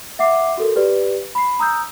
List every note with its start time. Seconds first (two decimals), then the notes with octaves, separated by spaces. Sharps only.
0.19 E5 F#5 D6 C7
0.58 F#4 A4 A#4
0.76 G4 B4 D5
1.35 B5 C7
1.59 A#5 D#6 E6 G6